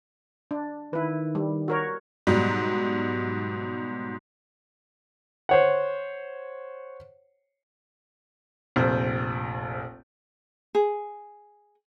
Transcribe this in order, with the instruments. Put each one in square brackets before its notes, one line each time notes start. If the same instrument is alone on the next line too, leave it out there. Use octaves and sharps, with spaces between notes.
[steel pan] D4
[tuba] D#3 [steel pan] E4 B4
[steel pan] G3
F#4 A#4 C#5
[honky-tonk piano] G#2 B2 F#3 G3
[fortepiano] C5 C#5 F#5
[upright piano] F1 A#1 C5
[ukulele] G#4